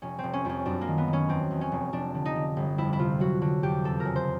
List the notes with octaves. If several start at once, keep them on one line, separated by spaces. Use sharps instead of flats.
F1 C#4
F1 C4
C#4
F2 C#4
F#2 D4
A#3
D#3
B3
D#3
C#4
E2 C4
E2
C#4
F1
F1 D4
D3
D#4
D3
G1
F2 E4
E4
C3 F4
F#3 F#4
D3 F#4
F2 G4
E2 A4
A#4
C#3
C5